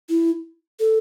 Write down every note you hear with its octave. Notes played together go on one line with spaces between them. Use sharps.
E4
A4